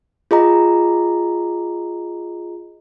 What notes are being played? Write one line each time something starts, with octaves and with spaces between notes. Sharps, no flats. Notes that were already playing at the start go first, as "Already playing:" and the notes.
F4 G#4 D#5 A#5